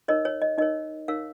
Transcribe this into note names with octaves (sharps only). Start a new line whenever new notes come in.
D#4 A#4 C#5 D#5
C#5
D#5
D#4 A#4 C#5 D#5
D#4 A#4 C#5 F5